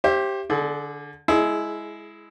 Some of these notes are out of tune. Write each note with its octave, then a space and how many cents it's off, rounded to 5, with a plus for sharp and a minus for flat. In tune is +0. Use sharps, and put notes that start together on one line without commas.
G4 -5 C5 +30 E5 +30
D3 +0 G#4 +40
G#3 +0 E4 +0 G#4 +25